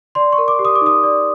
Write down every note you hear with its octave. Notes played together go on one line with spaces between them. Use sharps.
D5 C6
C#6
A#4
D6
G4
D#6
D6
D#4 D#6
D5